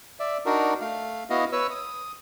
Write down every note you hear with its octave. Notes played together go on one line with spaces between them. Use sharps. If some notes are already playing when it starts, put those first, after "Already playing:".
D5 E5
D4 D#4 F#4 A#4
A3 F5
B3 E4 F#4 D#5 F5
B4 C#5 E6
D#6